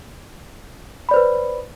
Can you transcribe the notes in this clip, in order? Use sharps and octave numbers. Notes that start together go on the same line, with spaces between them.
B4 C5 D5 B5